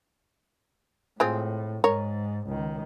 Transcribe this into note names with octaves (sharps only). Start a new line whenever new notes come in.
A2 G#3 C4 F4
G#2 A#4 C#5
C#2 D#3